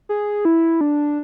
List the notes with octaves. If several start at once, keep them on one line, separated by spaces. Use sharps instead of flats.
G#4
E4
D4